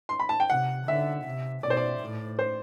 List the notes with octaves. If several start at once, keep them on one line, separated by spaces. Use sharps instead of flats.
C6
B5
A5
G5
C3 F#5
D3 E5
C3
B2 D5
C5
D5
A2
C5